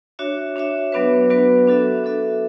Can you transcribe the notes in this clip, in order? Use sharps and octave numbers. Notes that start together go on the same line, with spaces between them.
D4 F#4 C#5 E5
D4 F#4 C#5 E5
F#3 B3 D4 F#4 B4
F#3 B3 D4 F#4 B4
D4 F#4 A4 E5
D4 F#4 A4 E5